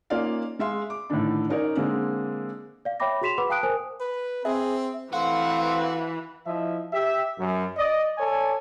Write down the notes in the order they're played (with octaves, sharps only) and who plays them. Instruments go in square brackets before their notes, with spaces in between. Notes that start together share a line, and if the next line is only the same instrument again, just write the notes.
[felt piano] A#3 C#4 D#4 F4 D5 F5
G#3 E5 F5 C6
D6
A2 D3 D#3 D4
C#4 D#4 A#4 C#5 D5
D3 G#3 A#3 C4
[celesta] D5 F5
C#5 E5 G5 B5 D6 A#6
F#4 G#4 C6 B6 E7 F7
B4 F#5 B5 D6
F5 G5 A5 D#6 F#6 D7
A#4 C5 G#5 D#6
[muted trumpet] B4
[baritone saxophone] C4 [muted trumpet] G#4 [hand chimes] E5
[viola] E3 B4 [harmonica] A3 C4 [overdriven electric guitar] F#4 [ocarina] F5
[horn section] F3 E4 D#5 E5
G4 E5
F#2
D5 D#5
A4 C#5 D5 G#5